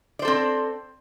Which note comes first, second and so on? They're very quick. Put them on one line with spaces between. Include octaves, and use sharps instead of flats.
D5 C5 A4 C4